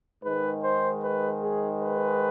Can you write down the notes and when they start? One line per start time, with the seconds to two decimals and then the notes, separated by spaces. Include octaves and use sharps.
0.24 G#2 D#3 G#3 B4
0.64 C5
1.03 B4
1.42 G#4
1.81 B4